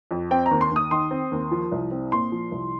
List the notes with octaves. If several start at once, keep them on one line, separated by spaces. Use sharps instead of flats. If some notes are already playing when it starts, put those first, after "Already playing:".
F2
C4 G5
A#5
D#2
C6
D#2 D#6
D#3 C6
C4
D#2
F3
C2
C4
A#2 C6
F3
C2